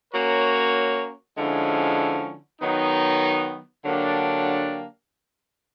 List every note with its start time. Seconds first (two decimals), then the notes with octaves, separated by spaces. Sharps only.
0.12 A#3 C#4 F#4 A#4 C#5
1.37 D3 F3 G#3 C#4 E4
2.60 D#3 F#3 B3 D#4
3.85 D3 F#3 A#3 D4 G4